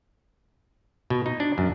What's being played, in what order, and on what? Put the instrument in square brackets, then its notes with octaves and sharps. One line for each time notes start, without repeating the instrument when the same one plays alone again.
[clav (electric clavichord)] B2
D#4
D4
F#2